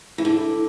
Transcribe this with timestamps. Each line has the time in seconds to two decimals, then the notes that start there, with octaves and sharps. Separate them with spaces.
0.18 E3
0.25 D3